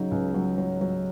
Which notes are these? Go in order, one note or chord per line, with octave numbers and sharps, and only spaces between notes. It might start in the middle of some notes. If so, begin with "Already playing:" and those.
Already playing: C#3 F#3 D#4
C#2
F#3
F#3
F#3